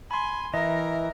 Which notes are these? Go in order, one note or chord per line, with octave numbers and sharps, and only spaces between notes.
G#5 B5 C6
E3 A#4 D#5 E5